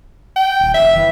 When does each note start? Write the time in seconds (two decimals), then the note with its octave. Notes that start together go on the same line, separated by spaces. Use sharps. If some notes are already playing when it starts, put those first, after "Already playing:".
0.36 G5
0.60 D#1
0.74 F1 E5
0.96 E3